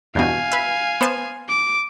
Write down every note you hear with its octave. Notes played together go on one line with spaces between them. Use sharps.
E2 G2 B2 F5 G#5
B4 E5
B3 C5 A5
D6